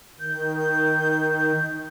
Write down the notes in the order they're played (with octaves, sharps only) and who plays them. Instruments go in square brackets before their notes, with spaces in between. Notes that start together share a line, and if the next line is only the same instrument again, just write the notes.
[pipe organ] D#3 [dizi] G6